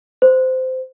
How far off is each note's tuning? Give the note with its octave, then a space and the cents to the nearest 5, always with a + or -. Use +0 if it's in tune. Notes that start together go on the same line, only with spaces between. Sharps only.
C5 -20